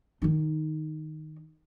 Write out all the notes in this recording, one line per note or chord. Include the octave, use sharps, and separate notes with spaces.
D#3 D#4